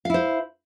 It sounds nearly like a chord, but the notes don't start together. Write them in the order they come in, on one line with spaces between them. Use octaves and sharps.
F5 E4 C5